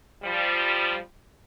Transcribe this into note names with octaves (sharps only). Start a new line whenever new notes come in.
F3 G3